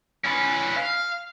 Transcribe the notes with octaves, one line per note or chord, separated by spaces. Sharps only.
C#4 B4
F5